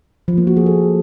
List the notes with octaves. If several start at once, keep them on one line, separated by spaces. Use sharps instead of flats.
F3
A#3
F#4
G#4
A4